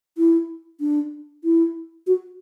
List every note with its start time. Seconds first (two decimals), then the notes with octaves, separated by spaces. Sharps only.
0.18 E4
0.81 D4
1.44 E4
2.07 F#4